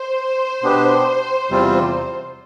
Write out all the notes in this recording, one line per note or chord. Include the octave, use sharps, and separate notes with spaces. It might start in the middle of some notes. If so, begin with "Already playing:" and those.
Already playing: C5
B2 B3 D4 G4 B4
E2 C3 G3 C4 F4